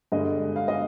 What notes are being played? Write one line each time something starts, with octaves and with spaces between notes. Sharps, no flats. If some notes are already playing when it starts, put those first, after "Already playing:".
G2 D3 G#3 D#5
F5
D#5